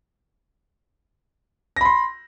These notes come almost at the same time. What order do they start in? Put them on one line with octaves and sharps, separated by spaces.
A#6 B5 C6